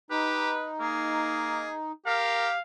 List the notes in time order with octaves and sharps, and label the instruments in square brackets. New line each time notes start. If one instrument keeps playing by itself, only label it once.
[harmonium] D#4 [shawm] G4 [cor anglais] B4
[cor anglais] A#3 [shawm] G#4
[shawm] G4 [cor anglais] A#4 [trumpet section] F5